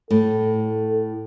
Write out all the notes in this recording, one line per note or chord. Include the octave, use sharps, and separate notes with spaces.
A2 A4